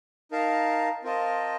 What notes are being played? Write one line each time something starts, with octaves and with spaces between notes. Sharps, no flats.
D#4 A#4 F5 A5
C4 F4 A#4 D#5 A5